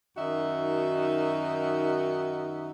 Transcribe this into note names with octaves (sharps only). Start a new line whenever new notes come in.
F#2 D#3 D#4 F#4 E5